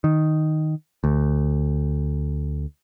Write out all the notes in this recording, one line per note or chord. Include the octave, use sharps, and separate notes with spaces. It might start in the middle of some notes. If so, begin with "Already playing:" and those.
D#3
D2